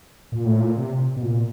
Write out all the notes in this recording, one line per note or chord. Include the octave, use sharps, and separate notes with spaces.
A#2
A2
A#2
C3
B2
A#2